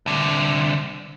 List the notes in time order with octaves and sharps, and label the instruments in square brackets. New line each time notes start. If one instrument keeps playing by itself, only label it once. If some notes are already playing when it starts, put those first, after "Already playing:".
[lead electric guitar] C2 D3